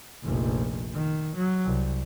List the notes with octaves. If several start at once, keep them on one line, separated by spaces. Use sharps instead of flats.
F1 A#1
D#3
F#3
C2